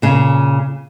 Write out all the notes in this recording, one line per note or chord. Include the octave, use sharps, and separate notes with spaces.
A#2 C#3